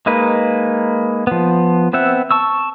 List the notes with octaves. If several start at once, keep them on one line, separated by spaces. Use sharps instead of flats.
G#3 A#3 D#4 B4
F3 B3
B3 C4 E5 F#5
A5 C#6 E6